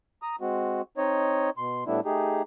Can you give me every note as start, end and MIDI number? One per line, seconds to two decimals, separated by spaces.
0.22 0.36 82
0.22 0.36 87
0.41 0.82 56
0.41 0.82 60
0.41 0.82 66
0.98 1.50 60
0.98 1.50 63
0.98 1.50 73
0.98 1.50 75
1.57 1.84 47
1.57 1.84 84
1.87 2.00 45
1.87 2.00 55
1.87 2.00 57
1.87 2.00 59
1.87 2.00 62
1.87 2.00 64
2.05 2.42 57
2.05 2.42 63
2.05 2.42 67
2.05 2.42 68